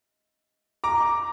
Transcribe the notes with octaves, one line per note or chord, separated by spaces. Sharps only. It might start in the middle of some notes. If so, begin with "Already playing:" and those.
A#5 D6